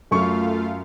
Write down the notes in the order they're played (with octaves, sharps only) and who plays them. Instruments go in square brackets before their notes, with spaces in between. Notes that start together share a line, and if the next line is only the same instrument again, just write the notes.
[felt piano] F#2 C#6 [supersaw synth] A3 F4 F5